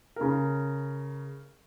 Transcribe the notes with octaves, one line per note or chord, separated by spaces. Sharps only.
C#3 A#4